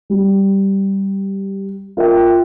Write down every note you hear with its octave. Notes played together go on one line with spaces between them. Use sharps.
G3
F4 A#4 E5 G5